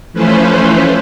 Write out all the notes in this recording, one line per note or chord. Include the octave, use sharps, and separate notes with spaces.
E3 F3 A3 C#4 B4 C5